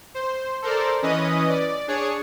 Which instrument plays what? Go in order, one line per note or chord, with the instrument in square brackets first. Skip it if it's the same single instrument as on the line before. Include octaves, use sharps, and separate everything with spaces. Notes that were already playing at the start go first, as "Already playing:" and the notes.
[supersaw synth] C5
A4 A#4 C5 D5
E3 C#4 B4 D#5 D#6
D5
D4 G#4 C#5 C#7